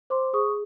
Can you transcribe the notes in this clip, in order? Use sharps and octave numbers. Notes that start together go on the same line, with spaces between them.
C5 C6 D6
G#4 C#6 D#6